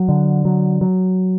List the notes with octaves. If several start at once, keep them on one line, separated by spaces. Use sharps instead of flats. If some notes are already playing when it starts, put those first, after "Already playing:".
Already playing: F#3
D3
F#3
F#3